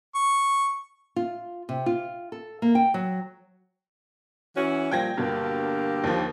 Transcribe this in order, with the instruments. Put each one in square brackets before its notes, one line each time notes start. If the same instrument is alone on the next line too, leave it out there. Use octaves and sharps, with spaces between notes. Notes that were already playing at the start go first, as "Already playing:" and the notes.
[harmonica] C#6
[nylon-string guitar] F4
C3
F4
A4
A#3
G5
F#3
[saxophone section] E3 C#4 F#4
[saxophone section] A#2 F3 G3 [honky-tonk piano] G5 G#6 A#6
[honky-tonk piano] G2 B2 [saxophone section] D3 A#3 G4
[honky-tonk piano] D#2 F3